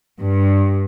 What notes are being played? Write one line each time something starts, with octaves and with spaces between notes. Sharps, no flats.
G2